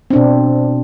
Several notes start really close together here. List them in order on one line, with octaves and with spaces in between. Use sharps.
C4 D4 B2